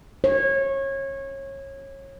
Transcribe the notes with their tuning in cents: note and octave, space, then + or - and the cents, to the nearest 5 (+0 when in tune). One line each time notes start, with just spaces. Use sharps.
C#5 -25